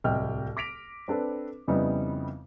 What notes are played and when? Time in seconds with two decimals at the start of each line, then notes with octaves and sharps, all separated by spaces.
0.04 D1 C2 D#5 G5 F6
0.57 D6 A#6 B6 D7 F7
1.08 C4 D4 A4 B4
1.67 F2 C#3 G3 B3 D#4 E4